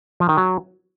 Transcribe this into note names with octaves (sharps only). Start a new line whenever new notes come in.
F3
D#3
F#3